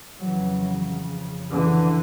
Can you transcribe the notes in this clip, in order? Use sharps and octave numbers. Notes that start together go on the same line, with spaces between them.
F2 C#3 E3 F#3
D3 E3